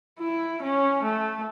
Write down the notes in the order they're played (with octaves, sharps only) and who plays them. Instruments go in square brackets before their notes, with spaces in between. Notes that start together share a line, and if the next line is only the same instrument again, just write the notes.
[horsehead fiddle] E4
C#4
A3